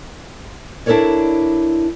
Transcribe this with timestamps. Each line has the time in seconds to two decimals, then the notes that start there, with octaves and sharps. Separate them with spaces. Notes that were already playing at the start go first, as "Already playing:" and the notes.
0.86 D4 E4 A4 A#4 C#5 D5